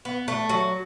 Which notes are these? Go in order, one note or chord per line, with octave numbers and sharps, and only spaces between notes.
B3
A3
F#3